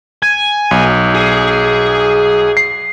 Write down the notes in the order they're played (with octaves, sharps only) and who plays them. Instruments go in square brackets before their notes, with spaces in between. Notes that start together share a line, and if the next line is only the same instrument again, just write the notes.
[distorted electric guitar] G#5 [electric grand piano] G#6
[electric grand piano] B1
[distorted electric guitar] G#4
[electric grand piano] C7